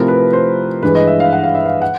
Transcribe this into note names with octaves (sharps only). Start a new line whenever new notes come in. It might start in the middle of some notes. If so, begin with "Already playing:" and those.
Already playing: C3 F3 A3 C4 E4 A#4
B4
C5
G2 E3 G#3 B4
D#5
E5
F5
F#5
F5
E5
F5
F#5